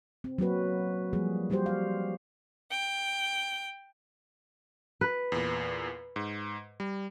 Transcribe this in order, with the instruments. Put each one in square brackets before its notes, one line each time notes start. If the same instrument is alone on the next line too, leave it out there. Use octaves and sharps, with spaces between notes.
[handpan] C4
F#3 A#3 F#4 B4
F3 G3 A#3 G#4
F#3 G3 F#4 G4 C5
F5
[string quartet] G5
[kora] B4
[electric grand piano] E2 A#2
G#2
G3